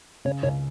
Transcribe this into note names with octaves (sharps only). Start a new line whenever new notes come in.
C#3 C#5
C#2 C#5